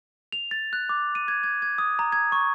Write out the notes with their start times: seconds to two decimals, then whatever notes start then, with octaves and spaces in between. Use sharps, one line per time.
0.32 F7
0.51 A6
0.73 F#6
0.89 D6
1.15 D#7
1.28 G#6
1.43 G#6
1.62 G#6
1.78 D#6
1.99 A#5
2.12 G#6
2.32 C#6